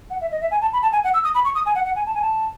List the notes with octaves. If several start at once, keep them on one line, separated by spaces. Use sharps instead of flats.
F#5
E5
D#5
E5
G#5
A5
B5
A5
G#5
F#5
E6
D#6
B5
C#6
D#6
G#5
F#5
F#5
G#5
A5
G#5
A5